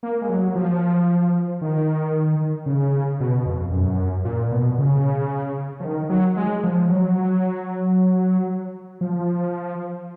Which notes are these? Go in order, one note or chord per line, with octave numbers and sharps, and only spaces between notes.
A#3
G#3
F#3
F3
D#3
C#3
B2
F2
F#2
A#2
B2
C#3
F3
D#3
F#3
G#3
F3
F#3
F3